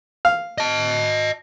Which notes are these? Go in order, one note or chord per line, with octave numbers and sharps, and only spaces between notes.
F5
D#5 A5